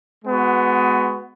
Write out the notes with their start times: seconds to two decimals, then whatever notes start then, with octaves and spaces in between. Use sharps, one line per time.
0.25 G#3 B3 F#4